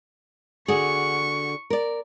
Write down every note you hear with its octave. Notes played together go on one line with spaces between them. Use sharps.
D3 F#4 G#4 C#6
A#4 D5